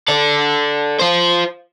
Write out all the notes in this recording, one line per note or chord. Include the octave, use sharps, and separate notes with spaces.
A4 D5
F4 C5